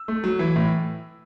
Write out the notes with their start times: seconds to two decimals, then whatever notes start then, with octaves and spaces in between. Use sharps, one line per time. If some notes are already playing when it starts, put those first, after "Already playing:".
Already playing: E6
0.08 A3
0.24 F#3
0.39 E3
0.56 A2